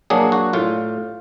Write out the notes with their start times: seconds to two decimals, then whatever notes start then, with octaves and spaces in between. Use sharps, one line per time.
0.10 F#3 A#3 D4 G#4
0.32 F#4
0.53 A2 F4